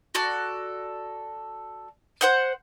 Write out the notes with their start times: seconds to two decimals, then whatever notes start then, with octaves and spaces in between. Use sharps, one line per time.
0.15 F#4 A4 D5 F#6
2.21 C5 F#5 G6